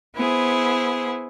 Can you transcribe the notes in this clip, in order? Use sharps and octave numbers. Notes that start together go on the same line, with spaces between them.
B3 E4 G#4 C5